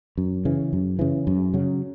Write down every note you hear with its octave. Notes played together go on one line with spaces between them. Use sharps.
F#2
C#3 E3
F#2
C#3 E3
F#2
C#3 F#3